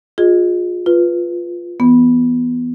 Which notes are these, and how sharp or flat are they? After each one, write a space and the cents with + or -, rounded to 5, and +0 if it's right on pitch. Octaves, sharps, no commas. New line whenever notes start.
F4 +30 G#4 +0 D#5 +0
F4 +0 B4 +0
E3 +10 B3 +0